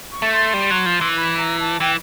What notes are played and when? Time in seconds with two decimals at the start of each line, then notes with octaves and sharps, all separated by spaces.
0.12 C#6
0.22 A3
0.32 C6
0.54 G3
0.70 F#3
0.86 F3
1.01 E3
1.17 B5
1.38 A#5
1.60 A5
1.80 E3 G5